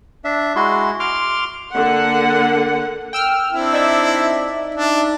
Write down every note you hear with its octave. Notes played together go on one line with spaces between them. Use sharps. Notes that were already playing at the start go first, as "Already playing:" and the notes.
D4 E5
G#3 E4 F#4 C6
C6 D6 F6
D3 A#3 F#5
G5 E6 F6
C4 D4 E4
D#4 D5 E5
D4